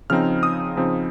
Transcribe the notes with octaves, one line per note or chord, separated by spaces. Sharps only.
C#3 F3 C4 D#4 F6
D#6
C#3 F3 C4 D#4